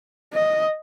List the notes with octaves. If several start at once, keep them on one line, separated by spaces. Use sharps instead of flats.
D#5